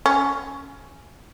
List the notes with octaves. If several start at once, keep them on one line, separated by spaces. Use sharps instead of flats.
C#4